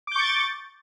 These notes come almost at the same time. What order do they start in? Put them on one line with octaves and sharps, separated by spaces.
D6 G6 C#6 A6